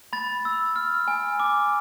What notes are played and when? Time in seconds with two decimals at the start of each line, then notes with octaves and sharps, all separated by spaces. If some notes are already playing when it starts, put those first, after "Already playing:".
0.13 B5 A6
0.45 E6
0.76 F6
1.08 G#5
1.40 D6